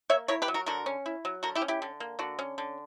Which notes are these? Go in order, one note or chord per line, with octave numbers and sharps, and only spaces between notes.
A#3 C#5 E5
E4 A#4 C#5
G4 B4
F#3
F#4 A#4
D3 F#4 A#4
C#4
E4
F#3
D3 F#4 A#4
E4 G4
C#4
E4 G4
D3
A#3
D3 F#4
C#4
D3